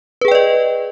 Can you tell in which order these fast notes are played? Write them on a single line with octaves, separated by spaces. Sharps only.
B4 G#4 G5 D5 D#5